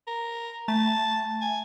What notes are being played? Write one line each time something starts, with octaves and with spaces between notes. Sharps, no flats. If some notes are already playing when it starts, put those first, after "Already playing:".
A#4
A3 A5
G#5